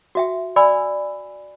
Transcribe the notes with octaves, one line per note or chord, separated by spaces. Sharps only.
F#4 E5 G5
D5 G#5 B5 E6